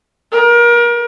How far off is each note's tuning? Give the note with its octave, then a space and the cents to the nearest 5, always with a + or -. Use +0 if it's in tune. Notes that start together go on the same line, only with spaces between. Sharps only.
A#4 +30